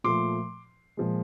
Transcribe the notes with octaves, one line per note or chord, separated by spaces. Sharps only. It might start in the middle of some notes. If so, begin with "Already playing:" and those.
A#2 F3 A3 C6 D6
A#2 F3 G#3